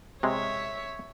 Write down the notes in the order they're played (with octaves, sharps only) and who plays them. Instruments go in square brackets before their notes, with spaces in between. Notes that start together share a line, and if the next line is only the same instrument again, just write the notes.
[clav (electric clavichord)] C3 G#3 [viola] C#5 E5